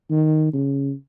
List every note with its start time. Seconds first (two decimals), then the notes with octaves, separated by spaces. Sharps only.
0.10 D#3
0.54 C#3